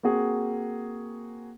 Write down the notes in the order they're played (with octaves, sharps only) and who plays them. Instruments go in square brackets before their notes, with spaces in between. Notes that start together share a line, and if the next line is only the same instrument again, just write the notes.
[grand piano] A#3 C4 F#4 G#4